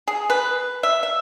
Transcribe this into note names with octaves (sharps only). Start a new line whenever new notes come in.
G#4
B4
E5
E5